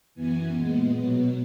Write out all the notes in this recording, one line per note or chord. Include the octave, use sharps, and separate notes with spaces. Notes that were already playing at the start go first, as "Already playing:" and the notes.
F#2 E3 B3 G#5
A#2 G#3 B3
B2 F#3 B3